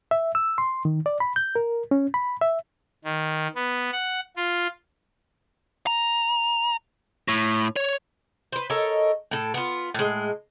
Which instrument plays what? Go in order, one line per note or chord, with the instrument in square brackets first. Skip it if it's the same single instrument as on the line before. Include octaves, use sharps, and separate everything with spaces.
[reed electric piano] E5
E6
C6
D#3
D5
B5
G6
A#4
C#4
B5
E5
[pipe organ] D#3
B3
F#5
F4
[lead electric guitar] A#5
A2
C#5
[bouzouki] B4 C5
A4 A#4 C#5 D#5
A2 A4
B3 F4
A2 G#3